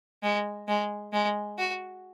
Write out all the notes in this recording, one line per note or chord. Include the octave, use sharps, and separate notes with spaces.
G#3
G#3
G#3
F#4